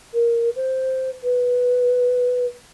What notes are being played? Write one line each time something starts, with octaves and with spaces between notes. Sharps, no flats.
A#4
C5
B4